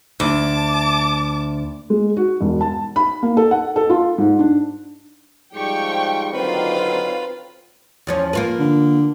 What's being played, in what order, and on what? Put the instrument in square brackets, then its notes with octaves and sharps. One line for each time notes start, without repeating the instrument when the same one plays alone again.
[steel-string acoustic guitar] D2 [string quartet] A5 D6
[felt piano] G#3
F#4
E1
A5
B5
A#3
A4
F#5
A4
F4
G#2
D4
[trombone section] G#2 F3 G3 [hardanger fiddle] G4 [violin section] G5 C#6
[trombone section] D3 D#3 F#3 [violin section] C4 F4 [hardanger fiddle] B4 F5
[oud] E2 F3 C#4
A#3 F4 B4
[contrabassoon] D3